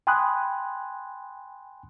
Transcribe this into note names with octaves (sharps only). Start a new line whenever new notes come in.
G5 G#5 B5 C6 D#6 F#6